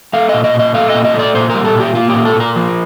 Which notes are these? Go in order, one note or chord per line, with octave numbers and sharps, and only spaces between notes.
A3 F5
A#2 D#5
D#5
A#2
D#5
A3 F5
D#5
A#2
D#5
A3 D5
A#2 C5
A#4
G3
A4
A#2 G4
A#3 F4
G4
A#2
A4
A#2 A#4
F3